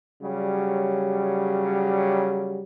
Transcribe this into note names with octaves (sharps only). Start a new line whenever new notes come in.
C#3 F#3 G3